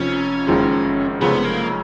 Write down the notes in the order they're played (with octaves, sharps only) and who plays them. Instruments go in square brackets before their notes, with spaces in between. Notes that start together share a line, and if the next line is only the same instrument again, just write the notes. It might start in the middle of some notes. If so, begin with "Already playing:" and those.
Already playing: [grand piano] F1 F2 F3 [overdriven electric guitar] C#4
[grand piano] F#1 F2 D#3 G#3
[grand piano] F1 F2 C#3 G#3 [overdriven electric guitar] B3
[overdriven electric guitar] A#3